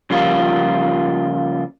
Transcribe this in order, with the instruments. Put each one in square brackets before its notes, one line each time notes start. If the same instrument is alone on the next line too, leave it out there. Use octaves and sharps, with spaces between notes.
[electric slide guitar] C#3 F3 G3 A#3 F4